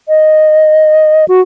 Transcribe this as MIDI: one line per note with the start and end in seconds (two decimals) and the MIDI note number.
0.09 1.25 75
1.28 1.41 66